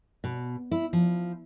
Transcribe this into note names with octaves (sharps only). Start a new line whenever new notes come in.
B2
E4
F3